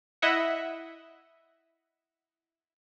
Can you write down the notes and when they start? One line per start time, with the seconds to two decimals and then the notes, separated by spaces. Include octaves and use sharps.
0.22 E4 D#5 E5 F#5